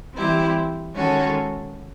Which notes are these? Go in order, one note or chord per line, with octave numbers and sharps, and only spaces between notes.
E3 G3 C4 E4 G4
D#3 G#3 C#4 F#4 A4